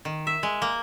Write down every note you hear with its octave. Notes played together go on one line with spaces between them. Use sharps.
D#3
E5
G#3
A#3